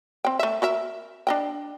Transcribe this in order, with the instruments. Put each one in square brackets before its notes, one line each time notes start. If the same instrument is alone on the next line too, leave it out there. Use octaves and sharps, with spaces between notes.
[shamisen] C4 G5
A3 E5
F#4 A#4 E5
D4 D#5 G5